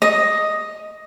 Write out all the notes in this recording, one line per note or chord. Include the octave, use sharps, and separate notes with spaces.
D#5